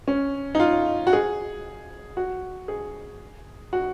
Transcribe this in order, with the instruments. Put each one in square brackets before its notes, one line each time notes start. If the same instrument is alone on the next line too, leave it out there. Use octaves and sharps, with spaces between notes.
[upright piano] C#4
D#4
F4
F#4
G#4
F#4
G#4
F#4